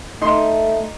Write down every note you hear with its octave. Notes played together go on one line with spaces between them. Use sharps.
A3 D#4 C6